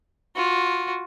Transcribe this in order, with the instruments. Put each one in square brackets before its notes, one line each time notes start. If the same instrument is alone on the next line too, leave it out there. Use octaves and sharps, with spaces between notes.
[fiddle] F4 F#4